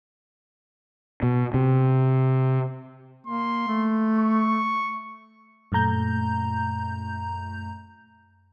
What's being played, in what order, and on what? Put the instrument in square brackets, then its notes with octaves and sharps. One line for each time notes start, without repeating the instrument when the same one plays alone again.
[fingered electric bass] B2
C3
[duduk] A#3 [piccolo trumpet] C6
[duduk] A3
[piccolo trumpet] C#6
[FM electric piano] F#2 A#2 A3 A#5 G6